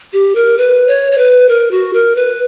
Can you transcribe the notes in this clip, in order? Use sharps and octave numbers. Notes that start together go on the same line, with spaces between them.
G4
A#4
B4
C#5
C#5
B4
A#4
F#4
A#4
B4